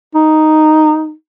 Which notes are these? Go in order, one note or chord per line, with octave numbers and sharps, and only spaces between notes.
D#4